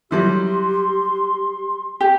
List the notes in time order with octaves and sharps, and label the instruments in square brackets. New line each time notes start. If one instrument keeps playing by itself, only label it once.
[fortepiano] F#3 G3 E4 [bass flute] G4 [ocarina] C6
[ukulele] G4 [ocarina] G5